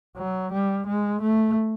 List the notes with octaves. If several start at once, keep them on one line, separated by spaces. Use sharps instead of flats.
F#3
G3
G#3
A3